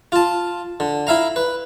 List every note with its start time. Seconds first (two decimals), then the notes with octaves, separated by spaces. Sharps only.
0.12 F4 A5
0.80 D3
1.07 E4 E5 F5 A#5
1.36 B4